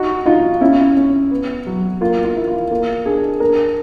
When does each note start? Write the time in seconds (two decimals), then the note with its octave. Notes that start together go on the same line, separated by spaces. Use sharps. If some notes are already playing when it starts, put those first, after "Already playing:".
Already playing: D#4 F#4
0.26 D#4 F4
0.61 C#4 E4
0.97 C#4
1.31 B3
1.67 F#3
2.01 A#3 F4
2.25 F4
2.36 E4
2.48 F4
2.71 A#3
3.06 D4 G#4
3.40 D4 A#4